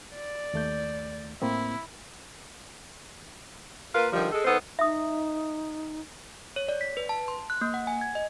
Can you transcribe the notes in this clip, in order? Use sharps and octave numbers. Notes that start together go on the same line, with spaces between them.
D5
D#2 A3 G6
A2 A#3 C4 E4
A#3 F4 A#4 B4
D3 D#3 F3 G3
G#3 A4
D#3 B3 A4 C5
D#4 E5 D#6
C#5
D5
B6
B4
A5
C6
F#6
A#3
F#5
G#5
G#6
D#5